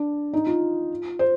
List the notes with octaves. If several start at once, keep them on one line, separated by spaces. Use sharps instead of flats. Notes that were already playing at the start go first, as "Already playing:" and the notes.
Already playing: D4
D#4
F4
C5